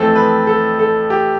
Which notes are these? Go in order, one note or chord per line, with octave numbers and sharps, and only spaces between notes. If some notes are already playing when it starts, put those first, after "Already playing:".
Already playing: F2 E3 A3 C4 A4
B4
A4
A4
G4